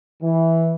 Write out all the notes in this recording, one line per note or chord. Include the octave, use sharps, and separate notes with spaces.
E3